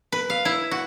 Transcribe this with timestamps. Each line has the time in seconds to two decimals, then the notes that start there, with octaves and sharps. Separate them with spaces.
0.12 B4
0.30 F5
0.45 E4
0.71 F#4